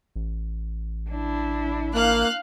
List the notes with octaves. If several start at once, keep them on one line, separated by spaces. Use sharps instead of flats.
A1
D4 E4
A#3 F5 F#6